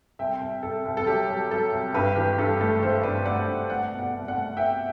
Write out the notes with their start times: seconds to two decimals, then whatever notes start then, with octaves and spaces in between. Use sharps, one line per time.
0.19 C2 E5 G5
0.41 C2
0.63 C2 A4
0.85 C2
0.97 A4
1.06 F#3 G4
1.28 F#3
1.50 F#3 A4
1.72 C2
1.94 G2 G4 B4
2.16 E3 G4 B4
2.38 G2 A4
2.61 A3 A4
2.82 E3 A4 C5
3.03 G2 B4 D5
3.25 A3 D5 F#5
3.48 G2
3.69 A3 D5 F#5
3.91 B2
3.99 D5 F#5
4.14 C2
4.28 D5 F#5
4.35 A3
4.57 C2 E5 G5